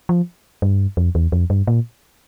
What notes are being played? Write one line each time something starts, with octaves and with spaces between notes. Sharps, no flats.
F3
G2
F2
E2
F2
G2
A#2